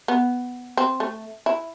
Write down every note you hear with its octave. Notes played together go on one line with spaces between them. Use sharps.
B3
C4
A3
E4